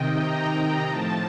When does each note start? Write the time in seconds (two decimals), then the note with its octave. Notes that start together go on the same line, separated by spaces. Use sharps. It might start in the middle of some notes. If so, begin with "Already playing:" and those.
Already playing: C3 D#3 D#5 G5
0.15 A#5
0.85 A2 F3 A5